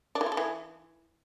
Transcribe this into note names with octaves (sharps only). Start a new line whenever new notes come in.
D4
E3
F4
A4
E3